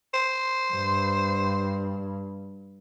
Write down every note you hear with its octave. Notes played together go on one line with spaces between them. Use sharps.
C5
G2